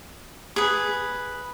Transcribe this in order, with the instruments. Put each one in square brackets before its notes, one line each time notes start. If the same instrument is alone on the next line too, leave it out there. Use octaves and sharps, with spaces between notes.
[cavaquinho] G#4 B4